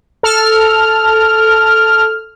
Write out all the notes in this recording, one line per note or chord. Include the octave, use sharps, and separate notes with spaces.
A4 F6